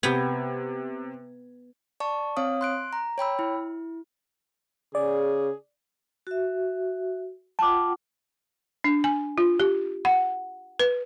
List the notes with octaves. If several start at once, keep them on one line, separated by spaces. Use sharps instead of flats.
C3 B3 G5 G#6
D5 A5 C#6
C4 C#5 F5 D#6
C6 F#6 D7
A#5
C#5 G5 B5 E6
E4
C#3 G#4 D5
F#4 E5
F4 F#5 G5 A5 D6
D4
G#5
F4
G4
F#5
B4